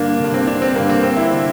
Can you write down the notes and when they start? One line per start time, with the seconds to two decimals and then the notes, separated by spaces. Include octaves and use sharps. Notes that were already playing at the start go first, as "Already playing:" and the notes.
Already playing: G2 D3 A#3 D4
0.20 G2 D3
0.34 C4
0.47 D4
0.62 C4
0.75 G2 D3 A#3
0.89 C4
1.03 C4
1.17 E4
1.34 D3